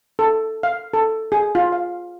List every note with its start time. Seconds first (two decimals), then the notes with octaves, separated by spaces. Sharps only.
0.19 A4
0.63 F5
0.94 A4
1.32 G#4
1.55 F4
1.72 F5